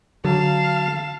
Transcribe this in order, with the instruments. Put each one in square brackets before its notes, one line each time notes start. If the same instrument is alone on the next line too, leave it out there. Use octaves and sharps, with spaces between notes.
[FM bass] D3 [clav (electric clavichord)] F#3 [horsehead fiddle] F5 [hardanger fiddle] A5